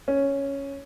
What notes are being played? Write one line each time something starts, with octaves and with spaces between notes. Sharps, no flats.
C#4